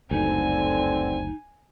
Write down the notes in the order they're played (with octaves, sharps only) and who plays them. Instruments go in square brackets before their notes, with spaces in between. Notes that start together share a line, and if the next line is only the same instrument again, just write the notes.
[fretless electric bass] F#1 D2 [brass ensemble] G2 D3 C4 [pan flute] D#4 [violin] G#5